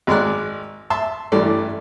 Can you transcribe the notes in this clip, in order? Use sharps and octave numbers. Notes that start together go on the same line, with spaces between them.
G#1 G#3 D5 F#6
E5 A5 C6
A1 G2 E3 A3 A4 D5